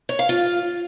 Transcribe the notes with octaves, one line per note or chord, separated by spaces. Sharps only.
C#5
F5
F4